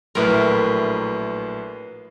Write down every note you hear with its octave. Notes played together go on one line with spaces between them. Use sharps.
A#1 A2 F#3 A#4 B4 E5